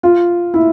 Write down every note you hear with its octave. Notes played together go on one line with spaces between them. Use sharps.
F4
E4